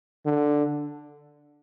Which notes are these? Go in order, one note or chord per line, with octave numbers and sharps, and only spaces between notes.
D3